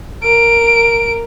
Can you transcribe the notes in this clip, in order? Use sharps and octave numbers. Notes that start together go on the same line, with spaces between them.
A#4 D7